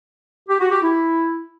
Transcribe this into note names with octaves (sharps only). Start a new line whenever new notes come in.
G4
F#4
G4
E4